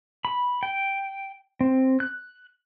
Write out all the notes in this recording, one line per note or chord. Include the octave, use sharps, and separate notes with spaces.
B5
G5
C4
F#6